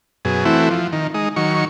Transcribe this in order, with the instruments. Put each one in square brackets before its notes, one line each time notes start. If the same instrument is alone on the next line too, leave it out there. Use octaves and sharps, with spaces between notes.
[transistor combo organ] F#2 B2 G#4
E3 A3 C4 E4 F#4
F3
D#3
G#3 D#4
D#3 F#3 C#6